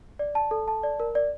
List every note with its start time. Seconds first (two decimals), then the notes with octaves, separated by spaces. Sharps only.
0.19 D5
0.35 A5
0.51 A4
0.68 A5
0.83 D5
1.00 A#4
1.15 D5